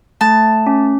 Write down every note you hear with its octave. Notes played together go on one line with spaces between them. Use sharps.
A3 A5
C#4